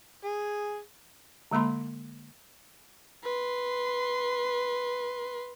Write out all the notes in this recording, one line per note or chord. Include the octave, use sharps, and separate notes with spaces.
G#4
D3 G#3 A#3 B5 C6
B4 C6